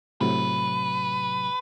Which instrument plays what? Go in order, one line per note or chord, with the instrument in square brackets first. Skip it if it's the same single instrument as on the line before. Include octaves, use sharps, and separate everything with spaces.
[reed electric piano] A2 C3 F#3 [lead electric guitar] B4